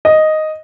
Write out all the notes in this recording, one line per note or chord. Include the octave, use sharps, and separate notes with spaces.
D#5